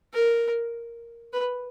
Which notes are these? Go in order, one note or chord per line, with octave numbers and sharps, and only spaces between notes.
A#4
B4